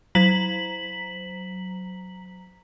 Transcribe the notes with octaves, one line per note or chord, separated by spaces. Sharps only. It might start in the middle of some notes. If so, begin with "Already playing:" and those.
F#3 A#5 B6 F#7